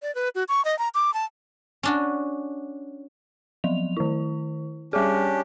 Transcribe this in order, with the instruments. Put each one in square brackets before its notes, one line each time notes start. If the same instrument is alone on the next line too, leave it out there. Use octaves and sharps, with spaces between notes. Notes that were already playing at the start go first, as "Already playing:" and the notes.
[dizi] D5
B4
F#4
C#6
D#5
A#5
D6
A5
[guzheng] C#4 D4 F#4
[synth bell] F3 F#3 F7
D#3 E4
[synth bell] G3 G#4 [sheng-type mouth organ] C#4 D4 G4